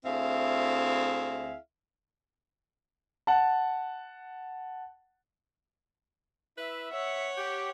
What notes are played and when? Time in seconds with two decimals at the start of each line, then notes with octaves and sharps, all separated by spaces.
0.05 D2 C4 E4 G#4 E5 F5
3.27 F#5 A5
6.58 E4 B4 E5
6.92 C#5 E5 F#5
7.38 G4